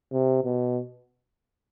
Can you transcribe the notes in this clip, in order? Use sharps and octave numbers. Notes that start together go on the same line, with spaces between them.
C3
B2